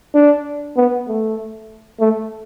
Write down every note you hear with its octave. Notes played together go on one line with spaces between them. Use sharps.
D4
B3
A3
A3